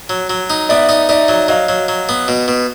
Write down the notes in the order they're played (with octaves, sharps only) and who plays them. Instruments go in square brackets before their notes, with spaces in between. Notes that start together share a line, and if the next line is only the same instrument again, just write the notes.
[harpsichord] F#3
F#3
D#4
[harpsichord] B3 [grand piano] D5 E5
[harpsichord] D#4
[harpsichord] D#4 [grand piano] D5 E5
[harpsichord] F#3
[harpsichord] F#3 [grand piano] D#5 F5
[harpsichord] F#3
F#3
B3
B2
B2